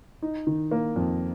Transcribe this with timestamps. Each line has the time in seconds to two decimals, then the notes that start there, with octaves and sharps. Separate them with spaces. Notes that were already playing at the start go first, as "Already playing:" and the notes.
0.22 D#4
0.47 D#3
0.71 A#3
0.96 F2